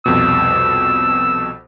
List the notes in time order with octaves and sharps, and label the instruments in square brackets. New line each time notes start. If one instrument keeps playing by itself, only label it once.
[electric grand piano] C2 F2 B2 [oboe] E6